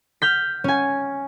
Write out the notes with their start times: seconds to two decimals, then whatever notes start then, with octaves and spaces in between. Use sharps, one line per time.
0.22 F6 G6 B6
0.64 C#4 G#5